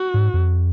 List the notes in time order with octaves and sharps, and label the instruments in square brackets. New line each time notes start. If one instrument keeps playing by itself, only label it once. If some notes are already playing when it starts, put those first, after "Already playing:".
Already playing: [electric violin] F#4
[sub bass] G#2
F2